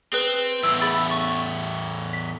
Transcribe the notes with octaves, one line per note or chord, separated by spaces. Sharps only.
C4 G#4 B4
E2 A2 E6
G#4 B5 A6
C#6
B6